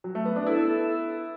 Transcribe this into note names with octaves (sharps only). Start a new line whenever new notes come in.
F#3
A3
B3
D4
B3 E4 A4
A4